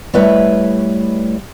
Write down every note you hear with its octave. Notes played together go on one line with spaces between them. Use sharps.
G3 A3 E4 B4 C#5 E5